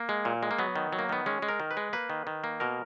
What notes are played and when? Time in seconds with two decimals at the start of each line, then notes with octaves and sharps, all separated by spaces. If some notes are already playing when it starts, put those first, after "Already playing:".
Already playing: A#3
0.09 G#3
0.25 A#2
0.43 G#3
0.51 A#3
0.59 F#3 B3
0.76 D#3
0.93 F#3
0.99 A#3
1.09 D#3 B3
1.26 G#3 C#4
1.42 G#3
1.49 A#4
1.60 D#3
1.71 B4
1.77 G#3
1.93 A#3 B4
2.10 D#3
2.27 D#3
2.44 A#3
2.60 B2 A#4